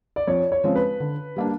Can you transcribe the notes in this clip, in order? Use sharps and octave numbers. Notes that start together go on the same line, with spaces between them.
D5
F2 C#5
C#5
C#3 F3 G#3 C4
B4
D3
G3 A#3 D4